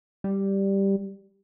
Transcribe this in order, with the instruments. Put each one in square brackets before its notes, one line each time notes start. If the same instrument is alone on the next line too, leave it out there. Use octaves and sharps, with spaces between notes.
[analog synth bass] G3